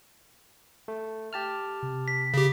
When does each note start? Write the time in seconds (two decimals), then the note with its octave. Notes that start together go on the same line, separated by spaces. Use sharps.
0.88 A3
1.33 G4 A5 F6
1.83 C3
2.08 B6
2.34 C#3 G4